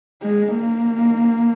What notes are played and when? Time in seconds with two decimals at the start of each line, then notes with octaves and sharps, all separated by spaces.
0.23 G#3
0.55 A#3